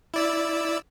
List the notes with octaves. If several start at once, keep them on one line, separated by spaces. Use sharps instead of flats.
E4 D5 E6